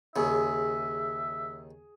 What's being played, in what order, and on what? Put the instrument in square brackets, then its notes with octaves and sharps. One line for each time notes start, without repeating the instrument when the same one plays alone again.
[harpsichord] D#2 C#3 [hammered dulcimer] G#4 [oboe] E5